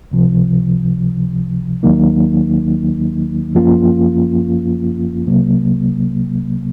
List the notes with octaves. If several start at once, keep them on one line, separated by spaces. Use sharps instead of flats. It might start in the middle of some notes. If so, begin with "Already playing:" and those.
C#2 C3 F3
D#2 D#3 F#3 A#3 D#4
F#2 F3 A#3 C#4 F4
C2 C3 F#3 A#3